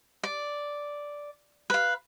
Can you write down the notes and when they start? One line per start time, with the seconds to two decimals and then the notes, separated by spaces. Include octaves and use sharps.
0.23 D5
1.70 B4 F5